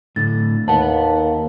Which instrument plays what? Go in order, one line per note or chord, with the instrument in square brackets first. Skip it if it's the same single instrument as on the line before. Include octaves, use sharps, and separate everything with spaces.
[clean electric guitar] A2 D3 [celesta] A6
[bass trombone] D#2 [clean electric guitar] B4 F#5 [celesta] A5